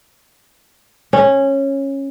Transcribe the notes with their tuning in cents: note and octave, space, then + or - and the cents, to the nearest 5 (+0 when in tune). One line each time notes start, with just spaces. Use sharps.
C#4 -15